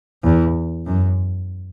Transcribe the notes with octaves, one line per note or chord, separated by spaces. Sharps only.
E2
F#2